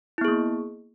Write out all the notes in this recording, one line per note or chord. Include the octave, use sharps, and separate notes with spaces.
A#3 B3 E4 G#4